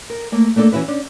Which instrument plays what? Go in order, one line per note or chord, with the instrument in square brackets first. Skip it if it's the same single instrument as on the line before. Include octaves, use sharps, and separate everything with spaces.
[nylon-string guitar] A#4
A3 A#3
A3 A#3 D4 F#4 A4
E3 C#4 E4 F#4 B4
C#4 D4